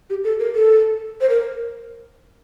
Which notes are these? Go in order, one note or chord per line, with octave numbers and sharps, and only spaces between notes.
G4
A4
A#4
A4
C5
A#4